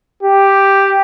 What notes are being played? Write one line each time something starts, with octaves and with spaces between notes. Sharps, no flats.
G4